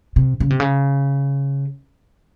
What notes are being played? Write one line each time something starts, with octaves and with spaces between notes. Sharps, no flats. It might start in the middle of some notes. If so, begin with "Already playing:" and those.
C3
C#3
C3
C#3